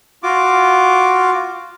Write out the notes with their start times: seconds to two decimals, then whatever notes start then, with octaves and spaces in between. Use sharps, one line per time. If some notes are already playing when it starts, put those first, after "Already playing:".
0.23 F4 F#4 D6